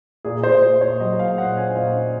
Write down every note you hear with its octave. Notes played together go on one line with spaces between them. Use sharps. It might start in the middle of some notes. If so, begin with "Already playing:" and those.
A#2 G#4
A#2 C5
A#2 C5
A#2 C#5
F#3 D#5
A#2 F5
A#2 F#5
C#4 G#5
A#2 F5
C#4